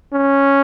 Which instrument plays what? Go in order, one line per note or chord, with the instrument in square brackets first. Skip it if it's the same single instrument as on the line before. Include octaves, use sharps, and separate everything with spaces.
[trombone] C#4